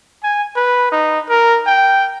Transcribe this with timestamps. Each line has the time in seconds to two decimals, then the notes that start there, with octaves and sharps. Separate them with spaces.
0.23 G#5
0.56 B4
0.92 D#4
1.29 A#4
1.67 G5